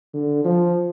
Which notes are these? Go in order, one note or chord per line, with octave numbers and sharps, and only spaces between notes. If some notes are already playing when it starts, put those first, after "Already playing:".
D3
F3